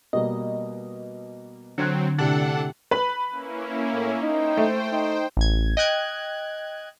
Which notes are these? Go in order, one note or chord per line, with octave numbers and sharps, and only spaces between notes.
B2 G3 A#3 D#5
D3 F#3 C4 F#6 G#6 C#7
A2 C3 D4 A4 F#5 A6
B4 B5
A#3 C#4 E4
A2
D#4 C5 G5
A3
D#4
A1 G#6
D#5 G5 F#6 G#6